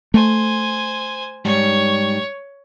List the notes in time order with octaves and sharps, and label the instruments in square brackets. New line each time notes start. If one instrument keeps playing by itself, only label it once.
[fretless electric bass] A3 [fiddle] C5 G#5
[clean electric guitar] G#2 G3 D#4 [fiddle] C#5